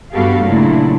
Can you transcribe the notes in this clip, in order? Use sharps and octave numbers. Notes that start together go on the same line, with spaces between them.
G2 B3 F#4 G4 A4 F5
A#2 C#3 F#3 A3 D4 E4